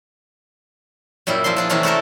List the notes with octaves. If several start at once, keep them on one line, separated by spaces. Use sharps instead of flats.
F#2 A#2 G3 E4
F3 A#3 E4 C6
F3 D4 G#4
C3 E3 A#3 C#4 D4 E4
A3 E4 F#4 A4 A#4